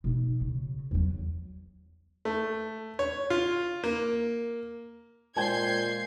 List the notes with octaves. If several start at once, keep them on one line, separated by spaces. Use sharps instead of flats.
B2 D#4
C#3
E2 F#3
A3
C#5
F4
A#3
A#2 G#3 C5 G5 G#5 G6 G#6 C7